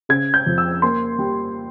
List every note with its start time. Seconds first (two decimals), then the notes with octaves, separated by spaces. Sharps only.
0.09 C#3 G#6
0.34 G6
0.46 F2
0.58 E6
0.82 A#3 C6
1.19 G3